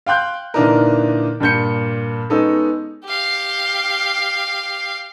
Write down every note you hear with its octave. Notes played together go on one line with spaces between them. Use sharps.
F5 G5 C6 F#6 G6
A#2 D3 E3 D4 D#4 A#4
G2 A#2 G6 C#7
G#3 B3 C#4 D#4 A4
G4 F5